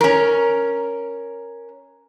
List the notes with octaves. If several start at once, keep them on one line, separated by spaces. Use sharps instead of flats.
C#4 A#4